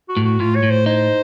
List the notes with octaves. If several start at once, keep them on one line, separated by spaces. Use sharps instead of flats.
F#4
A2
F#4
A2 F4
C#5
A2
C5
D#4 C5